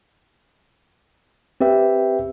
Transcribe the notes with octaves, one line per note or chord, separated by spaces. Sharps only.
C4 G4 B4 E5 G5